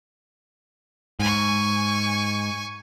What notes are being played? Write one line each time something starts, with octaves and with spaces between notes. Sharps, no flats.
G#2 G#5 C#6